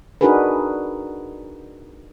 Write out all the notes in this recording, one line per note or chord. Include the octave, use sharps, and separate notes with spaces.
D4 D#4 F#4 G#4 A#4 B4